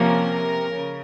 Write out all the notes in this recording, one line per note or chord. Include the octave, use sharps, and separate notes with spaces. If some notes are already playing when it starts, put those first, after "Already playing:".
Already playing: C3 F3 A#3 C#4 A#4
C#3